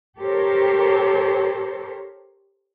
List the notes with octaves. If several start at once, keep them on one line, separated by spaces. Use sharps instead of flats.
G4 A4 A#4 C5 C#5